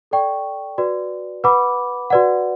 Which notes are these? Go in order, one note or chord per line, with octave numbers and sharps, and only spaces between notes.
A4 D5 G5 C#6
F#4 B4 D5
B4 F#5 B5 D6
F#4 B4 D5 F#5